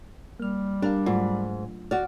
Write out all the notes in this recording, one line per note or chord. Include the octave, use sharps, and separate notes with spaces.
G3 A#3 F6
D4 G4 A#4 F5
G#2 F#3 A3 F4
F#4 D5 F6